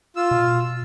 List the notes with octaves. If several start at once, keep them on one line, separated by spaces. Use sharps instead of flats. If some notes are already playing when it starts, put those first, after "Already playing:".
F4 E6
B2